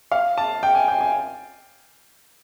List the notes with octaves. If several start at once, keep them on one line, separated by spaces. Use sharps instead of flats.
F5
A5
G5
G#5
G5
G#5